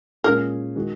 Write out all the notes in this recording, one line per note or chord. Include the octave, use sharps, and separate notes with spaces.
A#2 G#3 C#4 G#4 A#4
D#3 G#3 F#4